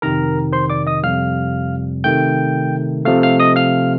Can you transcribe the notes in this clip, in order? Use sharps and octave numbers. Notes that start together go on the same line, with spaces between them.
F2 C3 D#3 A#4 A#5
C5 C6
D5 D6
D#5 D#6
F2 C3 G3 F5 F6
C3 D#3 A3 G5 G6
C3 F3 A3 F5 F6
F5 F6
D#5 D#6
F5 F6